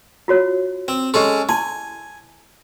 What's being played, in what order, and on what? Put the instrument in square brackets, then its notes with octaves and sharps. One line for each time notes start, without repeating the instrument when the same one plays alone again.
[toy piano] F4 F#4 C#5
[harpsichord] C4
[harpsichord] G#3 C#4 A4 [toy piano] G4 C6
[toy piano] E4 A5 C6 [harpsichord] G#5